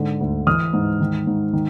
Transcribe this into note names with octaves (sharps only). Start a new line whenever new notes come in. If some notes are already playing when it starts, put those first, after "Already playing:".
Already playing: G#2 D3
D2
E3 D#6 F6
G#2
D#3
G#2
D#3